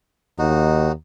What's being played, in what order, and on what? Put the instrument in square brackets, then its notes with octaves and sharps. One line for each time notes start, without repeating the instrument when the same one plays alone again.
[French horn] D#2 [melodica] D#4 F#4